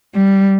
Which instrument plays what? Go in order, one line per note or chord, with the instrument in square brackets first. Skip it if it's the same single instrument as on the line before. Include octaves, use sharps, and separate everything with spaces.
[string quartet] G3